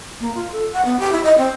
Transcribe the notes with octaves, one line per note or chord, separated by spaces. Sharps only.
A#3
F4
A4
F#5
B3
G4
E4
D#5
C4